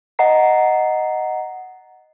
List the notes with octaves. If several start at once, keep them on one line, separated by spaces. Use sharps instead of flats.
D#5 F#5 A#5 C7